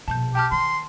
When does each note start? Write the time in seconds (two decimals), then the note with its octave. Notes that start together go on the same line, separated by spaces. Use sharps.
0.08 A#1 B2 A5 G6
0.35 G4 G5 A5 F6
0.52 D#3 C6